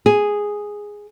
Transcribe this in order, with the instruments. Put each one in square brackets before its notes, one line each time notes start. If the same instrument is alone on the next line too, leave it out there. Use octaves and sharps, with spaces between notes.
[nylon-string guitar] G#4